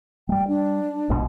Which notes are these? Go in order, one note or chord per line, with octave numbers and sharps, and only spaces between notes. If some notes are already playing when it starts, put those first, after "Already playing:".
G3 G#3 G5
D4
A#1 G#2 B2